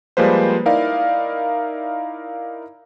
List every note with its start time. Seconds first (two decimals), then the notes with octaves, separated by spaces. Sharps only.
0.17 F3 G3 G#3 A#3 B4 C5
0.66 D#4 E4 A#4 D5 F5